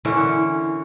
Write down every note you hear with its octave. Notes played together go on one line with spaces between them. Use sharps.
D3 E3 C#4 A#4